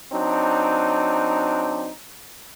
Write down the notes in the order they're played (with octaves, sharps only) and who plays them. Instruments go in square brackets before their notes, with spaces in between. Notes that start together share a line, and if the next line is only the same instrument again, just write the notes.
[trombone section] F#3 C4 D4 D#4